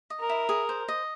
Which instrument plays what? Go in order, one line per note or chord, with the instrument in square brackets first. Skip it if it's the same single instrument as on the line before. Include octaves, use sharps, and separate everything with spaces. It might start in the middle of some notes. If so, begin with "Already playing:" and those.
[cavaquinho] D#5
[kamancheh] A#4
[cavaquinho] E4
G#4
C5
D#5